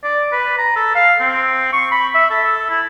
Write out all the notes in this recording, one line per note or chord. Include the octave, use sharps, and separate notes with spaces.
D5
B4
A#5
A4
F5
C4
C#6
B5
E5
A4
E4